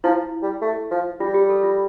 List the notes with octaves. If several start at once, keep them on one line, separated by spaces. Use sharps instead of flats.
F3 E4
G3
A3
F3
G3 F4
G4
A4
F4